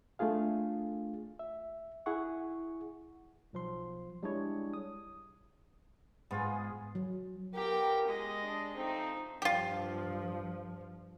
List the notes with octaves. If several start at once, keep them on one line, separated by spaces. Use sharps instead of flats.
A3 D4 F4 G#4 F5
E5
E4 G#4 F#5 C#6
B1 F3 C6
G3 G#3 D4 E4 G#4 C#5
D#6
G#2 B3 F4 G#4
F#3
B3 F4 G4 A#4 G5
G#3 D#5
D4
F3 A3 C4 D#4
G2 F3 F4 G4